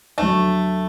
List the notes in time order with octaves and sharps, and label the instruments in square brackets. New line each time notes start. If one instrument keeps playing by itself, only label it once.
[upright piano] D2 D3 F#3 [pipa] A3